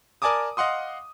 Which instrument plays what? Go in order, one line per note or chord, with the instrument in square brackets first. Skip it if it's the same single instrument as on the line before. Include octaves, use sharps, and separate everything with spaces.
[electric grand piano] A#4 D5 G#5 A5 D6 D#6
D#5 F5 F#5 C6 D#6